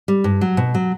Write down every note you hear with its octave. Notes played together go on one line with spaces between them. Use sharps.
G3
G2
F#3
B2
F#3